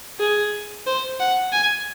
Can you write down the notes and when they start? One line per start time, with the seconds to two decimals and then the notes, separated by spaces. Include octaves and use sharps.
0.20 G#4
0.87 C5
1.20 F#5
1.52 G#5